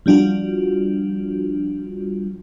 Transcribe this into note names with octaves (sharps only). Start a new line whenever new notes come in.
F3 G3 D4 F4 F#4